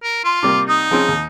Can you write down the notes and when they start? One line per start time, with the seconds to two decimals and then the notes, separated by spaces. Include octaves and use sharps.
0.03 A#4
0.24 F4 C6
0.43 C3 G3 A#3 D6
0.68 D#4 D#6
0.91 F3 C4 C#4 G#4
1.08 D#2